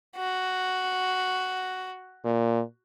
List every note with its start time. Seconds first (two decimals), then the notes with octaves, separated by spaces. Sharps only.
0.16 F#4
2.24 A#2